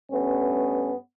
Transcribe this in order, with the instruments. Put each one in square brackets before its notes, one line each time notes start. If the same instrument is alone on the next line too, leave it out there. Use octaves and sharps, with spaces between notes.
[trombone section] G2 A3 B3 C#4